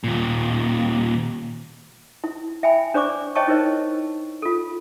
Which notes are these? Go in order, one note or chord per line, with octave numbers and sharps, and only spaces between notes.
D#2 A#2
E4
E5 G5 G#5 B5
D4 C5 D5 C#6 D6
C5 C#5 D#5 G5 A5 C#6
D#4 E4 A#4 C5 D#5
F4 A4